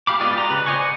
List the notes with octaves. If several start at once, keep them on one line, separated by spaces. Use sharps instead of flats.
G4 F5 B5 D6
G#3 B3 F4 D5 D#5
G4 A#5 C6
C#3 B4
C5 D5 D#5 G#5 C#6
F#5